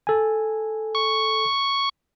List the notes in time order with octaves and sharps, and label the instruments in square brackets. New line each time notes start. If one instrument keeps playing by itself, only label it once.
[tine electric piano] A4 G#5
[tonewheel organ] C#6